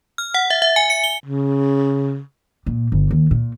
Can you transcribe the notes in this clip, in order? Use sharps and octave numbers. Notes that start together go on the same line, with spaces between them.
F6
F#5
E5
E5
G#5
C#7
G7
C#3
A#2
G1
D#2
A#2